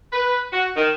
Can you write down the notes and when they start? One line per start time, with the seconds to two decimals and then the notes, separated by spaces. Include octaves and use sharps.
0.13 B4
0.53 F#4
0.76 D#3